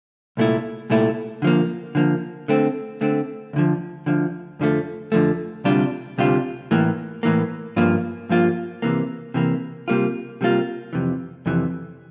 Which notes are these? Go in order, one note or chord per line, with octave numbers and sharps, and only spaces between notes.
C2 A#2 A3 E4
C2 A#2 A3 E4
D3 F3 A#3
D3 F3 A#3
D3 A3 C4
D3 A3 C4
D2 D3 F3
D2 D3 F3
F2 D3 F3 A3
F2 D3 F3 A3
D2 C3 G3 D4 F4
D2 C3 G3 D4 F4
A2 E3 A#3
A2 E3 A#3
G2 F3 A#3 F4
G2 F3 A#3 F4
C3 E3 A#3
C3 E3 A#3
C3 G3 A#3 F4
C3 G3 A#3 F4
F2 C3 E3
F2 C3 E3